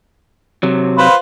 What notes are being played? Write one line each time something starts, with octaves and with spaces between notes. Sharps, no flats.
C3 F#3
F4 B4 C5